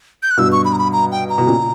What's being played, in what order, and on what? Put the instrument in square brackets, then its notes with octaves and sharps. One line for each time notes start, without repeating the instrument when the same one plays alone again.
[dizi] G6
F#6
[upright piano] G2 B2 [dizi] E6
[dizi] C#6
B5
A#5
B5
A#5
G5
A#5
[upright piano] B2
A#2 C#3